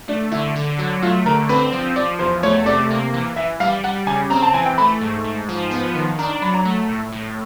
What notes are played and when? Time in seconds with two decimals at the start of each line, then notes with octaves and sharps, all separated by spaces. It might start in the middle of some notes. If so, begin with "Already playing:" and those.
0.08 A3 D4
0.31 D3 E4
0.56 D3
0.79 F#3
1.02 A3 F4
1.26 D3 A#4
1.49 C4 B4
1.72 F3
1.96 F3 D5
2.19 E2 C5
2.43 A3 C#5
2.66 C3 D5
2.90 A#3
3.14 E3
3.36 E3 E5
3.60 G3 F5
3.84 G3 F#5
4.07 C#3 G#5
4.30 C4 A#5
4.43 A5
4.54 E3 G#5
4.66 G5
4.78 A3 B5
5.01 G#2
5.24 G#2
5.49 F3
5.71 B3
5.95 D#3
6.19 D4 A#5
6.30 A#5
6.42 F#3 B5
6.54 A#5
6.65 A3
6.89 A2
7.12 A2